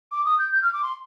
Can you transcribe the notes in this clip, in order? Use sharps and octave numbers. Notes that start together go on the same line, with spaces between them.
D6
D#6
G6
G6
F6
D6
C6